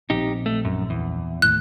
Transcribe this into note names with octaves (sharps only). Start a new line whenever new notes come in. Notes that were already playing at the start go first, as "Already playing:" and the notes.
A#1 C4 D#4 G4
A3
F#2
E2
D#2 A2 E3 F#6